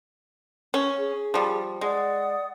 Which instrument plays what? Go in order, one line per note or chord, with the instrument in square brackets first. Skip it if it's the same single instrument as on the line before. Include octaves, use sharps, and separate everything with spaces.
[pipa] C#4
[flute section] G#4
[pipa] F3 G3
[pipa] G#3 [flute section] D5 F#5 D#6